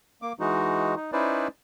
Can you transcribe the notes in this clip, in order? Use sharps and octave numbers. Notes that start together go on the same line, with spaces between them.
A#3 D6
E3 G#3 D#4 F#4
D#4
C#4 D#4 E4 B4 C5 D5